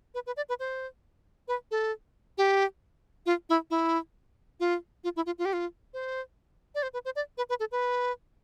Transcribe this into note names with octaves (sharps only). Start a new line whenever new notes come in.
B4
B4
D5
B4
C5
B4
A4
G4
F4
E4
E4
F4
F4
E4
F4
F4
G4
F4
C5
D5
C5
B4
C5
D5
B4
B4
A4
B4